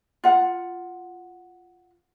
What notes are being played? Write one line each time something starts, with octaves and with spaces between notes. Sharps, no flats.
F4 F#5